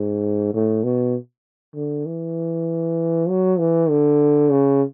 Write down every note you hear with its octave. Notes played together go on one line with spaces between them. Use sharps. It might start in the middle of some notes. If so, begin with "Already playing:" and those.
Already playing: G#2
A2
B2
D3
E3
F#3
E3
D3
C#3